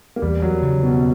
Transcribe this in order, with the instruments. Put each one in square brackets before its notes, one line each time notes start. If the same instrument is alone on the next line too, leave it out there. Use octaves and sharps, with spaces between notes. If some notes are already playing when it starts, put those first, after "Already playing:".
[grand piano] A#3
[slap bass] E2 [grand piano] G3
[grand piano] F#3
[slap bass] C#3
[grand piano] B2